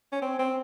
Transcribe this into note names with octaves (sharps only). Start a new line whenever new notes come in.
C#4
C4
C4